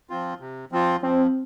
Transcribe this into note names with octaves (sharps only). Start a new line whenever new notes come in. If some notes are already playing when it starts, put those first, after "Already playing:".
F3 C4 F4
C3
F3 C4 F4
F3 C4